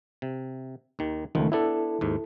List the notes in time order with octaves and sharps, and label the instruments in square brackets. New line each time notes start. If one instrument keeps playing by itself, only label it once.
[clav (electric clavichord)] C3
D#2 D#3
[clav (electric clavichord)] C#2 F3 [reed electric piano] D#3 A3
[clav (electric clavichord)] B3 D4 [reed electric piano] E4 A4
[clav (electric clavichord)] D#2 G#2